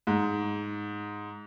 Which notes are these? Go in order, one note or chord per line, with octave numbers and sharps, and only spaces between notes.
G#2